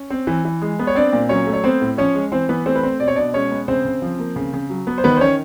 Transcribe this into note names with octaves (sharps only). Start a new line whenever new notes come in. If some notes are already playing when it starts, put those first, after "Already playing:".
Already playing: C#4
C4
E3
E3
G#3
B3
C#5
C4 D4 D5
A#2
F#3 C#4 C#5
A3
C#5
B3 C4 C5
A2
F3 C#4 C#5
G#3
E3 C4 C5
E3 B3 B4
A3 C4 C5
B4
C4 C5
B2 D5
C#5
B2 D4 D5
G#3 C#4 C#5
B3
C#3 C4 C5
C#3
F3
A#3
C#3
C#3
F#3
B3
C5
D#3 B3 B4
C5
D#3 C#4 C#5